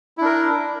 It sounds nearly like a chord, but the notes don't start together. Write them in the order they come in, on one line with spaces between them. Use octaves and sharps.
E4 D4 A#4